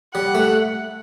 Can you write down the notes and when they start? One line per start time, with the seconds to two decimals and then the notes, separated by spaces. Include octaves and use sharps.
0.14 G3 F#5
0.35 A3